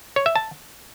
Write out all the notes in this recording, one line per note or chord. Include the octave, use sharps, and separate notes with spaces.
C#5
E5
A5